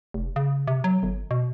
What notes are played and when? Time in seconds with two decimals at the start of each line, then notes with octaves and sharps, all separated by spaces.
0.14 F1
0.36 C#3
0.68 C3
0.84 F#3
1.03 G1
1.31 B2